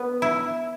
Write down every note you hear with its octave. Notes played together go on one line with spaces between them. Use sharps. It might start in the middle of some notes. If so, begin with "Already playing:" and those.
Already playing: B3
E4